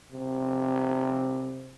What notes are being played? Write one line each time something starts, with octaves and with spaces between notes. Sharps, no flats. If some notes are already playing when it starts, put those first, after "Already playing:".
C3